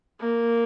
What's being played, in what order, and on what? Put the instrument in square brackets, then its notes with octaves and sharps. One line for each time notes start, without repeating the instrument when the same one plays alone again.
[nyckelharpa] A#3